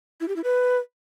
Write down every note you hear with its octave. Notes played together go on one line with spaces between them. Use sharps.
E4
G4
E4
B4